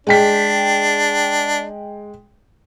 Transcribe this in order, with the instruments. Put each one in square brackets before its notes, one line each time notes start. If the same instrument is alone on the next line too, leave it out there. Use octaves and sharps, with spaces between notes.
[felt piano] G#3 G5 B6 [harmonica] D4